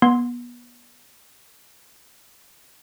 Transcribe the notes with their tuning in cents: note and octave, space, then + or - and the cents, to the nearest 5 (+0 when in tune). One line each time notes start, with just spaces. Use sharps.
B3 -30 C6 +0